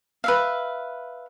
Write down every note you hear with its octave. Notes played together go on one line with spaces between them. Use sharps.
B4 E5 F5